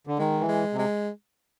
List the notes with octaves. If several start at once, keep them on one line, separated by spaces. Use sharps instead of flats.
D3
D#3 G#3
E3
G#3
C3
G#3